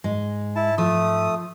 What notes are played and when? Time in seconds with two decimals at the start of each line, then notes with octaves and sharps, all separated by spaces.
0.04 G#2 G#3
0.56 E4 A5
0.78 F3 A3 D#6